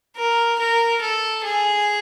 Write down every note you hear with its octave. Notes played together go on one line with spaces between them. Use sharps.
A#4
A#4
A4
G#4